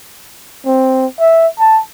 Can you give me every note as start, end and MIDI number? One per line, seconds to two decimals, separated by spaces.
0.65 1.06 60
1.19 1.47 76
1.59 1.80 81